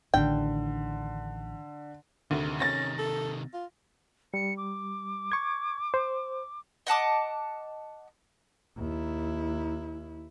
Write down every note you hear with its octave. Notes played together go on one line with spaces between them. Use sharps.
A1 D3 D#3 G5
D2 C3 D#3
C#4 A6 A#6
A4
F4
G3 C#7
D6
C#6 G#6
C5
D#5 F#5 A5 D6
D#2 E4